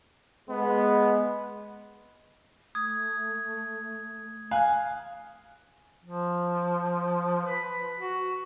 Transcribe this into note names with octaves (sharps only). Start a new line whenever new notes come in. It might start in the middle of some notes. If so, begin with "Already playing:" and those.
G#3 B3
A3 D#6 G#6
F5 G#5 F#6
F3
B4
F#4